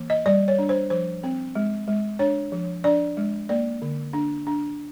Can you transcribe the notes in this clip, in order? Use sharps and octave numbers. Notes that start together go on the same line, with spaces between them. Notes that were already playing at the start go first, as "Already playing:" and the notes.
Already playing: E3 A#3
D#5
G3 D5
C#5
D4
C5
F3 C5
C4
G#3
G#3
D4 C#5
F3
D4 D5
G#3
A#3 D5
D3
D4
D4